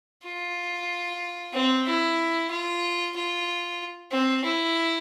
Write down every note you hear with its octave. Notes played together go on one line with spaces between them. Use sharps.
F4
C4
E4
F4
F4
C4
E4